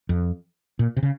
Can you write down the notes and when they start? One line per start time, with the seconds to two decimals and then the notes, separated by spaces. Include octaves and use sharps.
0.09 F2
0.79 A#2
0.97 C3
1.03 C#3